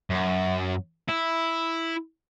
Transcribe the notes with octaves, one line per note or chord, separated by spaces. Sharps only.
F#2
E4